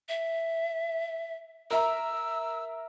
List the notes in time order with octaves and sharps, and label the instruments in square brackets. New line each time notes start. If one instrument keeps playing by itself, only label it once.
[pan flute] E5
[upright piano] A#4 E5 A#5 [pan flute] E6